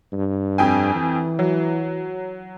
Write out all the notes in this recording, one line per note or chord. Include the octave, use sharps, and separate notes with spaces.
G2
F2 G5 G#5
E3
F#3